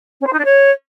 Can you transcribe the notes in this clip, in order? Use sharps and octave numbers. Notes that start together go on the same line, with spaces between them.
C#4
C5
D#4
D4
C#5